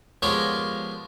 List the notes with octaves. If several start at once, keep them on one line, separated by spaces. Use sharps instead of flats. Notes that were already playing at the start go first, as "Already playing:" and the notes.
F3 G#3 B3 G4 A#4 C#5